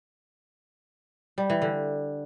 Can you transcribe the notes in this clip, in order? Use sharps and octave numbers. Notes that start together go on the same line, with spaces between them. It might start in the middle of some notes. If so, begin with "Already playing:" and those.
G3
E3
D3